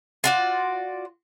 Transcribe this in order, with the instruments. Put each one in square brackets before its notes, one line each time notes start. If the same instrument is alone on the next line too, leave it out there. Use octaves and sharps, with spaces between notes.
[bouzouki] F4 F#4 D5